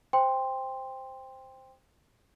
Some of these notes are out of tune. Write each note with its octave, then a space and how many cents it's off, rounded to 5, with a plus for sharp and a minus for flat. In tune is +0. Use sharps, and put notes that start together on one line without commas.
C5 +0 G5 +15 C6 +0